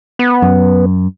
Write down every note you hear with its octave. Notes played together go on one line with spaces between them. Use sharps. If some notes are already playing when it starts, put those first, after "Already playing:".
B3
F#2